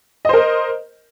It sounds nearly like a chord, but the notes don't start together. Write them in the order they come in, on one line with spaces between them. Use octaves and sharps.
D#5 C5 A#4